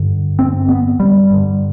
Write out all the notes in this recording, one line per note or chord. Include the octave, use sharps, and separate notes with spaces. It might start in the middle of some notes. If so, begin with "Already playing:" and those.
Already playing: G2 D3
C4
B3
G3
G2 D3